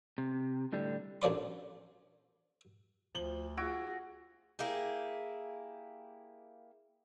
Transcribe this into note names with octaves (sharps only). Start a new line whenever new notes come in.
C3
A2 D3 G3
A1 D2 F3 D5 C6
D2 F3 F#7 G7
F4 F#4 G#4 E6 G#6 D7
A#3 E4 G4 G#4